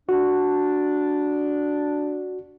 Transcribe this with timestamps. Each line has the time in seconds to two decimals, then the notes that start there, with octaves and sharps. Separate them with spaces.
0.09 D4 F#4